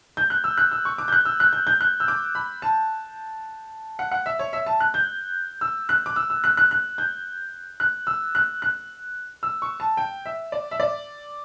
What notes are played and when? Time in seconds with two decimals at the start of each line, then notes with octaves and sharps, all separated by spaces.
0.17 G6
0.30 F#6
0.44 E6
0.58 F#6
0.72 E6
0.85 C#6
0.98 D6
1.08 G6
1.12 F#6
1.25 E6
1.40 F#6
1.53 G6
1.67 G6
1.81 F#6
2.00 E6
2.08 D6
2.35 B5
2.62 A5
3.99 F#5
4.11 F#5
4.26 E5
4.39 C#5
4.53 E5
4.66 A5
4.80 F#6
4.94 G6
5.61 E6
5.89 F#6
6.06 D6
6.16 E6
6.30 E6
6.44 F#6
6.57 F#6
6.71 F#6
6.98 G6
7.80 F#6
8.07 E6
8.35 F#6
8.62 F#6
9.43 E6
9.62 C#6
9.80 A5
9.97 G5
10.26 E5
10.52 D5
10.71 E5
10.80 D5